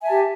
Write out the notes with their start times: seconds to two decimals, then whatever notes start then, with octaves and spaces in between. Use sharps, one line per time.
0.01 G#5
0.04 E5
0.06 A5
0.09 G4